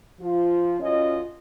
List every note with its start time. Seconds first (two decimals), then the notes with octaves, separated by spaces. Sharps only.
0.21 F3 F4
0.80 F#2 C#4 F4 D#5